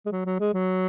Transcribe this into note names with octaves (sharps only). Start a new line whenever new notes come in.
G#3
F#3
F#3
G#3
F#3